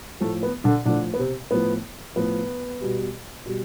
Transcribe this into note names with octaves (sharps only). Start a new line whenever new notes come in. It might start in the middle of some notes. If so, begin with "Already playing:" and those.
A2 F3 A3
B3
D3 D4
A2 D3 F3 D4
B3
C3 C4
A2 F3 B3
A2 F3 B3
B2 G3
B2 G3